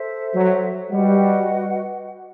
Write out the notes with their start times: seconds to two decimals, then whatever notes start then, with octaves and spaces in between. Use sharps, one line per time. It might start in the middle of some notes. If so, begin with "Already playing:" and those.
Already playing: A4 C5 E5
0.34 F#3
0.91 G3 F#4 B4 D#5 F#5